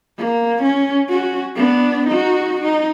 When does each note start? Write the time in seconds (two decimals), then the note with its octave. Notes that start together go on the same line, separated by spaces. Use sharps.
0.18 A#3
0.63 C#4
1.09 C#4 F#4
1.56 B3 D4
2.08 D#4 F#4
2.61 D#4